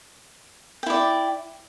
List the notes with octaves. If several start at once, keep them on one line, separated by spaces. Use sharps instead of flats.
E4 D5 G5